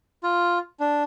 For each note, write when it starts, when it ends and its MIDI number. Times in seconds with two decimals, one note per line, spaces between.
0.23 0.58 65
0.80 1.03 62